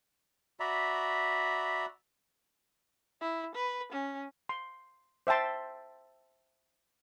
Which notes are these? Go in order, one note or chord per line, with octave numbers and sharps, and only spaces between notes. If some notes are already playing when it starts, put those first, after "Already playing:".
F#4 D5 E5 A#5 B5
E4
B4
C#4
C6
C5 E5 G5 A5 C6